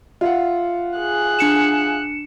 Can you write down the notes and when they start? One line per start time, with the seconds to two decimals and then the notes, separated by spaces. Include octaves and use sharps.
0.21 F4 E5 F#5
0.99 G#4 F#6
1.39 D4 C#7 E7